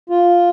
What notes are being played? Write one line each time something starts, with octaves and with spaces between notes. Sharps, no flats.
F4